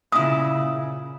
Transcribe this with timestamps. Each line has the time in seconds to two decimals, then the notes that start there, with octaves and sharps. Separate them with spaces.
0.12 A#2 C#3 E4 D#6